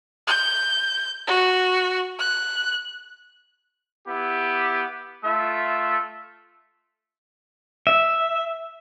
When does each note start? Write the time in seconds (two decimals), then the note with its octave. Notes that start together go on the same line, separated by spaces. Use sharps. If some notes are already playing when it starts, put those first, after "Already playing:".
0.27 G6
1.27 F#4
2.19 F#6
4.08 B3 E4 G4
5.24 A3 F4 E5
7.87 E5